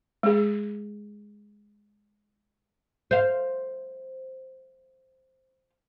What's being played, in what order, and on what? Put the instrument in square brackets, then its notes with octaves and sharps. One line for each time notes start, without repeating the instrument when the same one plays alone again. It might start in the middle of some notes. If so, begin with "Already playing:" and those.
[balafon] G#3 G#4
[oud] C5 F5